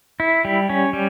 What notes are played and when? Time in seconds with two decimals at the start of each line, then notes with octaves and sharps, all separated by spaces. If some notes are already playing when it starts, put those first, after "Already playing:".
0.20 E4
0.45 G3
0.69 C#4
0.93 G3